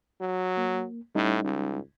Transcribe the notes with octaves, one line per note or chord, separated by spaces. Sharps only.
F#3
A#3
A2 G3 C#4 D#4
C#2